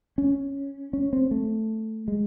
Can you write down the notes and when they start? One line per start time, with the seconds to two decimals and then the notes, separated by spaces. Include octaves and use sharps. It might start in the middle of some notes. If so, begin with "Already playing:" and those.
0.18 C#4
0.93 C#4
1.13 C4
1.31 A3
2.08 G#3